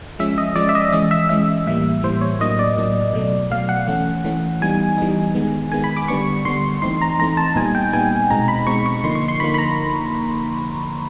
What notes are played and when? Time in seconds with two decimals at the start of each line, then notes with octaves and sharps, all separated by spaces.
0.19 F3 G#3 C#4 E5
0.38 D#5
0.56 F3 G#3 C#4 D5
0.69 E5
0.75 D#5
0.92 E3 G#3 C#4 D#5
1.11 E5
1.29 E3 G#3 C#4 E5
1.66 A2 E3 G3 A#3 E5
2.03 A2 E3 G3 A#3 C5
2.21 C#5
2.40 A2 F#3 A#3 D4 D#5
2.59 D5
2.77 A2 F#3 A#3 D4
3.14 B2 F#3 A3
3.51 B2 F#3 A3 F5
3.69 F#5
3.87 E3 A3 C#4
4.25 E3 A3 C#4
4.61 E3 G3 B3 D#4 G#5
4.98 E3 G3 B3 D#4
5.35 D#3 G#3 B3
5.71 D#3 G#3 B3 G#5
5.84 B5
5.97 D6
6.08 D3 G3 B3 D4 C#6
6.45 D3 G3 B3 D4 C6
6.82 E3 A3 C4 D#4 C6
7.01 A#5
7.19 E3 A3 C4 D#4 A#5
7.37 A5
7.56 A#2 G3 B3 D#4 G#5
7.75 G5
7.93 A#2 G3 B3 D#4 G#5
8.30 B2 G#3 C4 D#4 A#5
8.48 B5
8.66 B2 G#3 C4 D#4 C#6
8.86 C#6
9.03 D3 F3 A#3 D#4 C6
9.15 C#6
9.28 C6
9.40 D3 F3 A#3 D#4 B5
9.54 B5
9.58 A#5